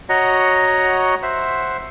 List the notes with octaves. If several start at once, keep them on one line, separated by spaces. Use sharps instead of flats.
F#4 C#5 D#5 F#5 A#5
C5 E5 F#5